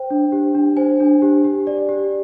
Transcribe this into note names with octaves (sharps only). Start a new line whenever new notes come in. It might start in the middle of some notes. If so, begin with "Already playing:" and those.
Already playing: C5 G5
D4
G4
D4
C5 G#5
D4
G4
G4
D5
G4